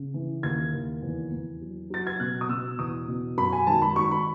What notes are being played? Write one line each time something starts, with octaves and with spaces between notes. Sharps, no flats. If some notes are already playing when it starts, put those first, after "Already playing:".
Already playing: C#3
E3
D#2 G#6
D#2
E2
E2
F#3
F#3 A6
G#6
B2 F#6
D#6
B2 E6
E2 D#6
B2
F#2 B5
G#5
G#1 A5
B5
G#1 C#6
B5